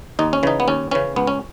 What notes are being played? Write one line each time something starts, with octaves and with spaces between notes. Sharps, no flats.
D#2 D#4
C#4
C#3 E3 D#4
B3
D#2 C#4
C#3 E3 C#4
C#2 B3
C#4